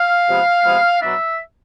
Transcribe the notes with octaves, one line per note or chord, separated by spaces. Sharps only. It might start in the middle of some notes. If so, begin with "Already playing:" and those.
Already playing: F5
C3 F3 G#3 B3
C3 F3 G#3 B3
B2 F#3 B3 D4 E5